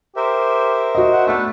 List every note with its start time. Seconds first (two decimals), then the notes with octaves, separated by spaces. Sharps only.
0.16 G4 A#4 C5 E5
0.95 F#4 D#5
1.13 F#5
1.27 A3 B3 D4 B4 E6